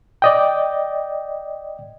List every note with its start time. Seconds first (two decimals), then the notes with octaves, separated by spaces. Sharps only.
0.22 D5 D#5 G5